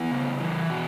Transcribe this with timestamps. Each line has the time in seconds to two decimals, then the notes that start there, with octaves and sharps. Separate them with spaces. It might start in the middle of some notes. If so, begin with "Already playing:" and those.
Already playing: B3 E4
0.11 C#3
0.40 E3
0.70 B2 F#4